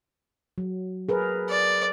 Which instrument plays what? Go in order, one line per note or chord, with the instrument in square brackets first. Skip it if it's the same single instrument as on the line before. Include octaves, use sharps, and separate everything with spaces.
[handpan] F#3
G#4 A#4 B4
[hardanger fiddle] D5